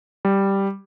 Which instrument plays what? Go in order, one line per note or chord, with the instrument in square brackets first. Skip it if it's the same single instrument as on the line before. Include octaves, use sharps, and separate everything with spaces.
[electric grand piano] G3